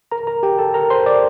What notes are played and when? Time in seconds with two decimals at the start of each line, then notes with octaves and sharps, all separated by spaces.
0.12 A#4 A#5
0.27 A#4 A#5
0.43 G4 G5
0.59 A4 A5
0.74 A#4 A#5
0.90 C5 C6
1.06 D5 D6